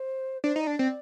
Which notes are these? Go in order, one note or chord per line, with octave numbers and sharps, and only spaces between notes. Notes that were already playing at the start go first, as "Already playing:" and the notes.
Already playing: C5
D4 C5
D#4
D5
D4
C4 D5